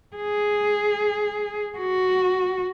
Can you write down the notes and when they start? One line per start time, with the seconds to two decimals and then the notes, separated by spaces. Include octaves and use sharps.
0.17 G#4
1.79 F#4